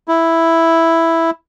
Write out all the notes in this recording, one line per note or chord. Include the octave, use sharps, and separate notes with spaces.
E4